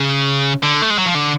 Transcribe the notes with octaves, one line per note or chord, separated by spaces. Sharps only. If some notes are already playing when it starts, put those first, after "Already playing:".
Already playing: C#3
D3
A3
G#3
F#3
F3
D3